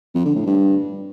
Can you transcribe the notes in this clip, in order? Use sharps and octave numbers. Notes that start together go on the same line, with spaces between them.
F2
D3
A2
G2